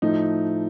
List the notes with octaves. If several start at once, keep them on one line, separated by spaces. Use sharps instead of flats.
A2 F3 A3 D#4